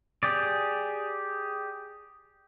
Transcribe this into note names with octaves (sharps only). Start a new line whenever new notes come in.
G4 G#4 D5